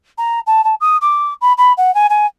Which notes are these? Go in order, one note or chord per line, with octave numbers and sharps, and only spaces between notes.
A#5
A5
A5
D#6
D6
B5
B5
F#5
G#5
G#5